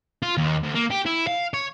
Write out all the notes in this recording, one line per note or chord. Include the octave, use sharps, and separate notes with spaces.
F4
D#2
D2
A#3
G4
E4
F5
C#5